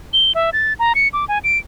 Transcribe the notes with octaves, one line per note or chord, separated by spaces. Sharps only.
G7
E5
A6
A#5
C#7
D6
G#5
D7